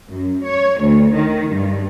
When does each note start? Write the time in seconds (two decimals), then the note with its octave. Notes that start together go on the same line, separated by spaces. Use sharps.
0.12 F#2
0.47 C#5
0.82 D2
1.15 D#3
1.52 G2